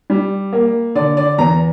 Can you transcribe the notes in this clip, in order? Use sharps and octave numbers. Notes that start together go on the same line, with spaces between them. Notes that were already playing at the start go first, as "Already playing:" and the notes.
G3
A#3
D3 D5
D5
E2 A#5